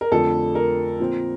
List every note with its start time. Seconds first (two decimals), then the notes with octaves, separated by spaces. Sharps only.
0.01 A#4
0.11 F2 D3 F3 A3 A4
0.55 A#4
1.00 A#2 F3 C4